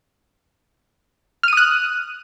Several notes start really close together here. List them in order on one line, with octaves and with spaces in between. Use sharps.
F6 D#7 D#6 F#6